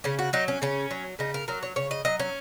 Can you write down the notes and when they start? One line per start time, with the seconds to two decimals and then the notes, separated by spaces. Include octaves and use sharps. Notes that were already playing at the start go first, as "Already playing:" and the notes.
0.04 C#3 C#4
0.19 F#4
0.33 F#3 D#4
0.48 C#4
0.62 C#3 C#4
0.91 F#3
1.19 C#3 D#4
1.34 A#4
1.48 F#3 A#4
1.63 C#5
1.76 C#3 C#5
1.91 D#5
2.05 F#3 D#5
2.19 C#4